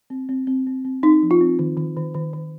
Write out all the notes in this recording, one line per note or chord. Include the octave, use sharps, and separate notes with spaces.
C4
C4
C4
C4
C4
C4 D#4
F3
F4
C4
D#3
D#3
D#3
D#3
D#3